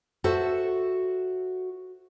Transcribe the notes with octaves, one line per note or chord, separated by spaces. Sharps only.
F#4 A4 C5 E5